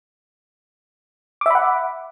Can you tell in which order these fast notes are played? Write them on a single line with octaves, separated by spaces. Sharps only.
D6 E5 B5 F#5